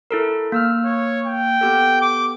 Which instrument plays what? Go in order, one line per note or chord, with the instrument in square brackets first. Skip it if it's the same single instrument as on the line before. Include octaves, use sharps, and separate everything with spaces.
[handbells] E4 A4 A#4
A#3 E6 F6
[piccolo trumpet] C#5
G5
[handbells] B3 G4 A4
[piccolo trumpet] D6